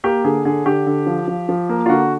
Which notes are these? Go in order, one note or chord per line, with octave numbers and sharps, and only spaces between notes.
A#3 G4
D3 G#4
D3 G#4
D3 G4
D3
F3
F3
F3
A#3
F4
D3 F#4